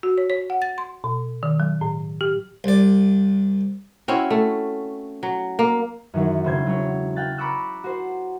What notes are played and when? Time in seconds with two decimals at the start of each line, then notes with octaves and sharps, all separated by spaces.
0.03 F#4
0.18 C#5
0.30 C#5
0.50 F#5
0.62 A6
0.78 C6
1.04 B2
1.43 D#3
1.60 F#3
1.81 A2
2.21 G4
2.64 C2 D5
4.08 C4 C#4 E4 F#4
4.30 A3
5.23 F#3
5.59 A#3
6.14 F#2 D#3 E3 F#3
6.44 E1 C#3 C5 G6 G#6
6.66 F#3 C#5
7.16 F5 G5 F#6 A6
7.38 A#5 B5 C#6 D6 E6 F#6
7.84 F#4 C5